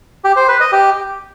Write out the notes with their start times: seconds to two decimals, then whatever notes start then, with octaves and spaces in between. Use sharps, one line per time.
0.24 G4
0.36 C5
0.48 B4
0.60 D#5
0.72 G4